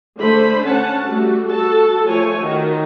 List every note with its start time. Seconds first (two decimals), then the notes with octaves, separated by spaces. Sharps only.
0.19 D3 A3 C5 B5
0.65 C#4 F#5 A5
1.06 G3 A3 F#4
1.47 F#4 A4 A5
2.07 F3 A3 C#5 G#5
2.41 D#3 F#4